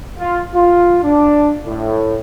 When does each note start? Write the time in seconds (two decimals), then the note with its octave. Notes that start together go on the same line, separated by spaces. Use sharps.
0.18 F4
0.54 F4
1.03 D4
1.65 A2